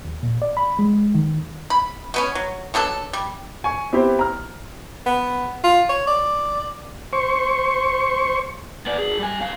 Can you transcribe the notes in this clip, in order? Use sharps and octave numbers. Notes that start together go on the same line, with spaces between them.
D#2
A#2
D5
B5
G#3
D#3
B5
B2 B3 C#4
F#3
B2 F#3 D4 A4
G3
G#5 C#6
B3 C4 E4 G4 C5
A#5 F6
B3
F4
C#5
D5
C5 C#6
B3 D5
G#4 A#4
G3 G#5
B2 F5